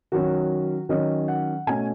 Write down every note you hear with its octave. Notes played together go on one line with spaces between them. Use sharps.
D#3 F#3 C#4 F#4
D#3 F#3 C#4 D#5
F#5
B2 A3 C#4 G#5